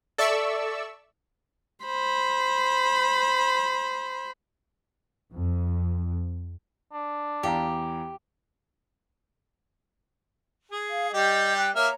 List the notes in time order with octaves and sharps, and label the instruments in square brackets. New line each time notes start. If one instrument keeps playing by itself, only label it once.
[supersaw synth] A4 D5 E5 C#6 E6
[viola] C5 B5
[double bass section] F2
[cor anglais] D4
[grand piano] E2 F5 A#5 [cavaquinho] G4
[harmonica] G#4
[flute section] F5
[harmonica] G3 G4 [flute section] D#5 G6
[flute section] G5 F#6
[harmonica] A#3 E5 F6 [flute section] C#5 A#5